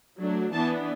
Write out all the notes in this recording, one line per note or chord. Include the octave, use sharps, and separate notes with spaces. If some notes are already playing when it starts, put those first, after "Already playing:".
F#3 A3 D4
E3 B3 D4 A5